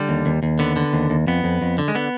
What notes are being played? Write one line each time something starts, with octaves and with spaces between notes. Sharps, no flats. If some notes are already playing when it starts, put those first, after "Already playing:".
Already playing: D3 G3
D#2
D#2
D#2
D3 B3
D3
D#2
D#2
F2 B3
F2
F2
D3
G#3
D3 B3